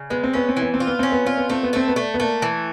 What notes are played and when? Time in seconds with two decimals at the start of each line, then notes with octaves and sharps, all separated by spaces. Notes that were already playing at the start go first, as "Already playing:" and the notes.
Already playing: C#3
0.10 G#3 B3
0.24 C4
0.33 B3 C#4
0.49 C4
0.57 E3 B3
0.74 C4
0.80 F4
0.87 B3
0.99 C4 C#4
1.12 B3
1.25 C4 F4
1.37 B3
1.49 A3 C4
1.63 B3
1.73 A3 C4
1.88 B3
1.96 A3
2.14 B3
2.20 A3 A#3
2.42 E3